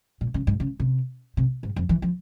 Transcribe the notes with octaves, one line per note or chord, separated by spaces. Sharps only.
A#2
C#3
G#2
C#3
C3
C3
G#2
F2
E3
F3